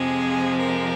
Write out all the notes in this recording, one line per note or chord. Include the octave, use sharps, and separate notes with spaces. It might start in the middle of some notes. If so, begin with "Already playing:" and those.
Already playing: F2 C3 F3 G#3 G#4
A#4